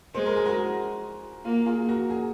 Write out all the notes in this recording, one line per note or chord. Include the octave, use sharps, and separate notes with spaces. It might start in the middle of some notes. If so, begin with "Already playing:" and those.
G#3 C5
A#4
G#4
F#4 A#4
A#3 F4
F4 G#4
F#4 A#4
G#4